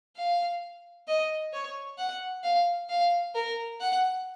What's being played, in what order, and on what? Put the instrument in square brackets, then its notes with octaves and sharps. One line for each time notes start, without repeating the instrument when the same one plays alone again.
[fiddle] F5
D#5
C#5
F#5
F5
F5
A#4
F#5